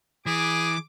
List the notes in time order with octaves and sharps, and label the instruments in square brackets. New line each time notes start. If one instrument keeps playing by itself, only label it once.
[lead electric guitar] E3 [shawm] G#4 [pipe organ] D6